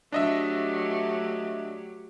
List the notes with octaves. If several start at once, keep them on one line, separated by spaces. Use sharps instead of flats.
F#3 A3 D4 G4 D#5 E5